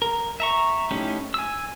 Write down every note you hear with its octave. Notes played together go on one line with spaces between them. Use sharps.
A#4
E5 A#5 C#6
A3 C#4 D#4 E4 G4
G#5 E6